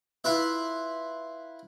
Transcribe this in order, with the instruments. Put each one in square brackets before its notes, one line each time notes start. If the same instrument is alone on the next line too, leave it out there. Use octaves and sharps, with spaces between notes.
[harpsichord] E4 F4 B4 E5